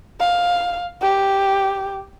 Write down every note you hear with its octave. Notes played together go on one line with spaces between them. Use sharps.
F5
G4